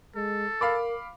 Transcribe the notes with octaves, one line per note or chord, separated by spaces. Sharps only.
G#3 A4
A#4 F5 B5 D6